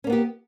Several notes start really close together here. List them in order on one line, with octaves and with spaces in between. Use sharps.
C#4 A#3 B3 G4